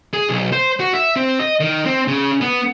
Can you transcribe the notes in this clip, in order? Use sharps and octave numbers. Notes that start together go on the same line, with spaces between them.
G#4
B1
C5
F#4
E5
C4
D#5
D#3
C4
C#3
B3